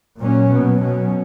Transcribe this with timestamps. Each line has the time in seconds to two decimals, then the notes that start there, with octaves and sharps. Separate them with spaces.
0.19 A#2 F#3 A#3 C#4
0.50 B2 F#3 B3
0.81 B2 F#3 C#4